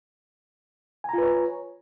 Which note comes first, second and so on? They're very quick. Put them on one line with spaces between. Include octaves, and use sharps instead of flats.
G#5 A#5 F4 B4 C#5